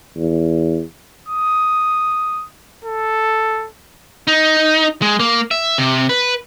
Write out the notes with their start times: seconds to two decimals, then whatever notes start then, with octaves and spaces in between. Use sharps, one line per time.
0.16 E2
1.29 D#6
2.84 A4
4.27 D#4
5.02 G#3
5.20 A#3
5.51 E5
5.78 C3
6.09 B4